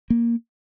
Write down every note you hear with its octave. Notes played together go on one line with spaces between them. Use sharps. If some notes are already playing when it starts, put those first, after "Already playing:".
A#3